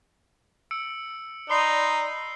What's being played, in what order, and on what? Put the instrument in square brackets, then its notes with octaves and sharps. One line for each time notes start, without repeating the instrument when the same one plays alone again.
[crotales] E6 C#7 D7
[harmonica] D#4 [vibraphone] D5 B5 C6 [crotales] C7 G7